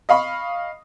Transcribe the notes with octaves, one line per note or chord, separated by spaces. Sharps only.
D#5 F5 B5 C#6